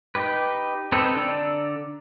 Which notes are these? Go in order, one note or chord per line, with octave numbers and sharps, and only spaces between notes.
D#4 G4 B4
C4 D#4 A4 B4
D3 D4 D5 A#5 E6